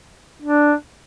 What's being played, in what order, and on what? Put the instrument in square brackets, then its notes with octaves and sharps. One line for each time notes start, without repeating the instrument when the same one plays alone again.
[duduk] D4